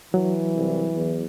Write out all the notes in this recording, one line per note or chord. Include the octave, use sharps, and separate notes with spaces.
E3 F#3
C2
E2